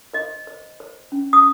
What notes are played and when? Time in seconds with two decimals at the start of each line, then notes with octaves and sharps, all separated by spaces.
0.13 C5 D#5
0.47 C5
0.80 C5
1.12 C#4
1.33 D#6